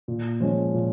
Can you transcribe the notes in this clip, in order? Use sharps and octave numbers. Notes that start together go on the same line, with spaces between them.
A#2
F3 G#3 C#4
A#2